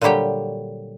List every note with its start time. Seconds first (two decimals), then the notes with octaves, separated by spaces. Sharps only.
0.01 A#2 D3 F#3 G3 G4 G5